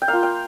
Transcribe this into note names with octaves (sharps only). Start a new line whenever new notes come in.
G5
A#3 F4 F5
G5